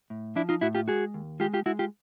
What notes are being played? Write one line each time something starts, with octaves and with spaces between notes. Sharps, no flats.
A2
F3 D4 E4
D#4 F4
A2 E4 F#4
F4 G4
G#3 F#4 G#4
D#2
G#3 F4 G4
F4 G4
G#3 E4 F#4
F4 G4